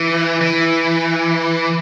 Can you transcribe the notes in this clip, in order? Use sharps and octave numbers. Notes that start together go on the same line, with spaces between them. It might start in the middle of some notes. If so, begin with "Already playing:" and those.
Already playing: E3
E3